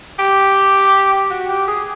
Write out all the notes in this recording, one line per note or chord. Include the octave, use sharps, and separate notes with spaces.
G4
F#4
G4
G#4